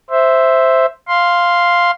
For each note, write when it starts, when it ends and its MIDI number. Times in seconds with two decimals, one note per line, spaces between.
0.10 0.86 72
0.10 0.86 76
1.08 1.91 77
1.08 1.91 84